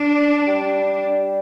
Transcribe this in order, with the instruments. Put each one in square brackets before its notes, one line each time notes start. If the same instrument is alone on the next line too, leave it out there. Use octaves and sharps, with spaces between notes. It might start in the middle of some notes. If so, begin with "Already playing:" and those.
Already playing: [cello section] D4
[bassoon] G3